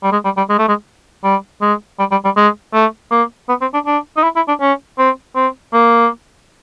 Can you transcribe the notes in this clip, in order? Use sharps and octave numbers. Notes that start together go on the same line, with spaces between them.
G3
G#3
G3
G3
G#3
A3
G#3
G3
G#3
G3
G3
G3
G#3
A3
A#3
B3
C4
D4
D4
D#4
E4
E4
D4
C#4
C4
C4
A#3